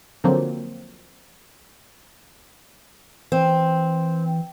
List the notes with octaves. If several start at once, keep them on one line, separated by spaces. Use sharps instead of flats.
D3 F3 F#3 A#3 C4
E3 C4